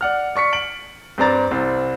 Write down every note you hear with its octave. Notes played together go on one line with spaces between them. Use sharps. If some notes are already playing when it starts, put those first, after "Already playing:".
D5 F#5 F6
D5 C#6 B6 C#7
D7 F#7
G2 C4 D5 A#5 A6
C2 C4